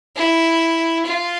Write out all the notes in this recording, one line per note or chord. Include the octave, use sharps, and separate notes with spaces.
E4
F4